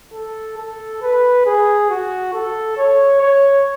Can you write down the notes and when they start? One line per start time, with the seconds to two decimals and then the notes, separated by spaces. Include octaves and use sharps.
0.13 A4
0.58 A4
1.02 B4
1.46 G#4
1.90 F#4
2.34 A4
2.78 C#5
3.21 C#5